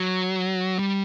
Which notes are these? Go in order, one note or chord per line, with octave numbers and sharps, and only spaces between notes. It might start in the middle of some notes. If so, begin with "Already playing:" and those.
Already playing: F#3
G3